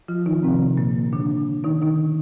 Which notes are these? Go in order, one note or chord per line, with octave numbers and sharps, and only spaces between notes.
F3 F4
D#3 D#4
C3 C4
A#2 A#3
D3 D4
D#3 D#4
D#3 D#4